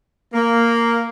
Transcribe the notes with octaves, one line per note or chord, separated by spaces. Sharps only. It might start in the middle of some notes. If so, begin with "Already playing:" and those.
A#3